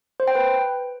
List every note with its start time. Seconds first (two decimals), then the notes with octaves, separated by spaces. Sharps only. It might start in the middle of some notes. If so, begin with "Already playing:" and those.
0.20 C5
0.28 G5
0.35 B4